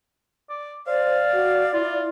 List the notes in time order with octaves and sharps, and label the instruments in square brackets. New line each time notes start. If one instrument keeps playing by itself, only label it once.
[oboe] D5
[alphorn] C5 [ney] D5 [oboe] F5
[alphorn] F#4
[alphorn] E4 [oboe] F4